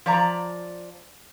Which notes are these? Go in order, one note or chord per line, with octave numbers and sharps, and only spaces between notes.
F3 D5 A#5